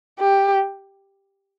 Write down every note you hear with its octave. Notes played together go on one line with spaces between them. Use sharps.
G4